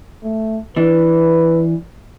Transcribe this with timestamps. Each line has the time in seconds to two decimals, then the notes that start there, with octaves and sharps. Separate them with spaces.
0.23 A3
0.76 E3 D4 B4